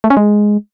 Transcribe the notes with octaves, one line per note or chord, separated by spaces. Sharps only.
A3
C#4
G#3